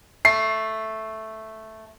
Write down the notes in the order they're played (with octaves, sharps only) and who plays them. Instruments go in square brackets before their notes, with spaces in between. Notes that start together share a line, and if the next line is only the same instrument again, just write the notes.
[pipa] A3 [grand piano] C7